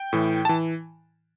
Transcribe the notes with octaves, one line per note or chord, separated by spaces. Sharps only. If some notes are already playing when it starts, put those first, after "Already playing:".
Already playing: G5
A2 E3
E3 A5